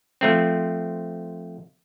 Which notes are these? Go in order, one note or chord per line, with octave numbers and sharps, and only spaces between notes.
F3 A3 C4